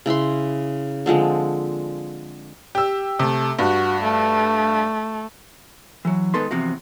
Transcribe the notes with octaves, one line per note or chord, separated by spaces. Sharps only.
C#3 E4 B5 C6
D3 F3 G#3 C4
G4 E6
C3 A3
G2 F#4
A3
E3 F#3
G#2 D#3 B3 A4 B4 C6
E2 C3 F3 F#4